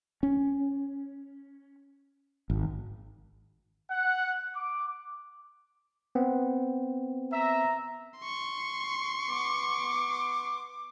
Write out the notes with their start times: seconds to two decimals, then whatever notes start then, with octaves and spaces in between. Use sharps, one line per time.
0.23 C#4
2.50 G#1
3.90 F#5
4.54 D6
6.15 B3 C4
7.33 E5 A#5
8.20 C6 C#6
9.29 B3 D6